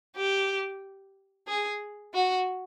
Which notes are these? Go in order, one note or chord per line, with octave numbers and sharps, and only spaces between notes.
G4
G#4
F#4